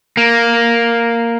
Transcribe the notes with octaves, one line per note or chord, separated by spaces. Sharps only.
A#3